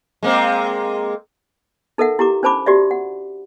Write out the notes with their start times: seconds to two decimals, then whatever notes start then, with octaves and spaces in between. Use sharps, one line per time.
0.23 G#3 A#3 C4
1.98 D#4 A4 A#4 E5 F#5
2.19 E4 G4 A#5 D6
2.43 C#4 D4 C5 A5 B5 D6
2.66 F#4 G4 D5 E5
2.91 F#5